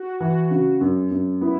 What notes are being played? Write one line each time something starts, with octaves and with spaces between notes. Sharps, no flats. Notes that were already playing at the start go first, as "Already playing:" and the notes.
Already playing: F#4
E3 F#4
C#3
F#2
F#2
B3 E4